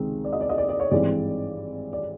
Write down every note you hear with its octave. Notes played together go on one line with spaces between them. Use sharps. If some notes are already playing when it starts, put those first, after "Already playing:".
Already playing: C#2 C3 D#3 G#3 C4
D5
D#5
D5
D#5
D5
D5
C#5
G#1 G2 E3 G#3 C4 D5
D5